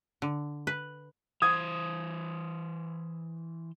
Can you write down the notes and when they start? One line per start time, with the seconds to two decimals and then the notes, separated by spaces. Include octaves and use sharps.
0.22 D3
0.67 B4
1.42 E3 C5 D#6 G#6